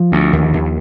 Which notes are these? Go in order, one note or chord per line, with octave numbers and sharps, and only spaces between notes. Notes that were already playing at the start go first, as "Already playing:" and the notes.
Already playing: F3
D2
D#2
D#2